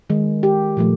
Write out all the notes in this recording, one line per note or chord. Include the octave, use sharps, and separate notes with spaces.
D#3 G#3
G4
A#2 F3 A3